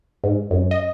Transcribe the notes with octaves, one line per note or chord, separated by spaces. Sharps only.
G#2
F#2
D#5